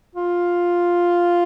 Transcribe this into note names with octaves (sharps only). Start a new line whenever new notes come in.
F4